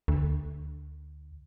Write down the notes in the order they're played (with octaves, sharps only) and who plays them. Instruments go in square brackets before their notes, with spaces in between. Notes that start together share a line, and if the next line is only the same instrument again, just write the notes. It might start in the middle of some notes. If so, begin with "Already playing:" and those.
[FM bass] D2